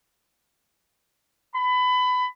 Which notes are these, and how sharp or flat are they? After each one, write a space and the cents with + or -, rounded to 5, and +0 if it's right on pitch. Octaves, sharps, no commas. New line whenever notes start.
B5 +20